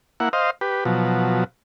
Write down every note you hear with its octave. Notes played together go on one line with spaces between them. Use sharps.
A#3 E4 F#5
C5 D#5 F5
G4 B4
B2 F3 F#3